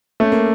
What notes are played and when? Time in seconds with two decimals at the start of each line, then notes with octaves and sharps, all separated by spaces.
0.20 A3 C#4
0.32 A#3